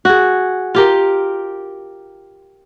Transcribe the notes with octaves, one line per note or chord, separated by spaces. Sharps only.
F#4 G#4
F4 G4 A#4